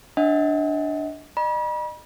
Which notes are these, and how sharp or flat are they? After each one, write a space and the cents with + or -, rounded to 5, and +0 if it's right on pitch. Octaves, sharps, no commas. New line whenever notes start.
D4 +0 D#5 +40 F#5 +0
D#5 -35 B5 -40